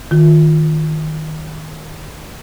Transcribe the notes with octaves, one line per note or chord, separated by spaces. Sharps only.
D#3 F4